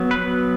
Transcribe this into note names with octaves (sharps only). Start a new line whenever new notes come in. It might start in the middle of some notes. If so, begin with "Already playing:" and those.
Already playing: F#3 B3
B4